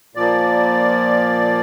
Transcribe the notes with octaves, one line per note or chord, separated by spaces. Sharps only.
A#2 F3 A#3 D5